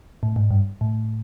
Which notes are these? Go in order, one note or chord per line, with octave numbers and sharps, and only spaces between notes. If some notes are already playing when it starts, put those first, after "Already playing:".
A2
G#2
G2
A2